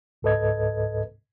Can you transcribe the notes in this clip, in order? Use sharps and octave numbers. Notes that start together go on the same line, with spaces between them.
C#2 G#2 A4 B4 D#5 G#6